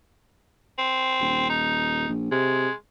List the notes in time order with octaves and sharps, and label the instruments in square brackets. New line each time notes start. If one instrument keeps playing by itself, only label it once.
[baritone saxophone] C4
[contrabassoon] D#1
[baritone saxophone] D#4
[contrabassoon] A#1
[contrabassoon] C3 [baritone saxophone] G#3